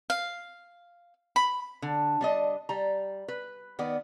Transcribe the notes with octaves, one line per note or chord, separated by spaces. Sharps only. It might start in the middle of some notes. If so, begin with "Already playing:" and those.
F5
B5
D3
G3 D4 D#5
G3 A#5
B4
D#3 B3 D5